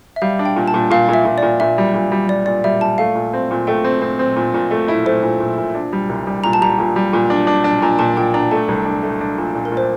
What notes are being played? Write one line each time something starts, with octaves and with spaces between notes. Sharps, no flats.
E5
G3 F5
D4
G5
A#2
A5
A#2
A#2 F5
A#2
E5
A#2
A#2 D5
A#2 E5
G3
A#2
G3
G3 D5
A#2 D5
G3 E5
A#2 A5
A3 F5
A#2
C4
A#2
A3 G5
C4
C4
C4
A#2
A#2
A3
E4
A3 C5
A#2
A#2
A#2
D4
G3
C2
G3
A#2 A#5
A5
G3 A#5
A#2
G3
A#2
D4
D4
D4
A#2 A#5
A#2 A5
A#2 G5
D4 A#5
A3 A5
C2
D4
A3
D4
A#2
A#2
A#4
A#2
C5